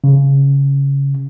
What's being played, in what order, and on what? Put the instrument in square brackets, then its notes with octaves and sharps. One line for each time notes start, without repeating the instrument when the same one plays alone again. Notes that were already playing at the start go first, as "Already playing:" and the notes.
[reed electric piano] C#3